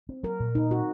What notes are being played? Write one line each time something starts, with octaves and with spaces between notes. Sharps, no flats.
C4
F#3 A#4
A#2
A#2 D#4
C4 F#4